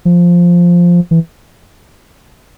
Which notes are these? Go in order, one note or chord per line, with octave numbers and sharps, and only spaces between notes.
F3
E3